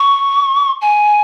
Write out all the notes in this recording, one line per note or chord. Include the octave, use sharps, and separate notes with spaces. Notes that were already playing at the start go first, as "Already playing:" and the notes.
Already playing: C#6
G#5